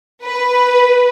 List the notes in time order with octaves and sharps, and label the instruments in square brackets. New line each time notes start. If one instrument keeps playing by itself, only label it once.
[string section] B4